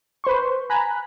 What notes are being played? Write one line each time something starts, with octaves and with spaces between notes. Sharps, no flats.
B4 C5 C6 C#6
G#5 A#5 B5 F#6